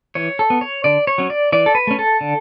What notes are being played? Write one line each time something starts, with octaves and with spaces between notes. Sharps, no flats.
E3 C#5
A4
B3
C#5
D3 D5
C#5
F#3 C#4
D5
E3 D5
A4
B4
A3 C#4
A4
D3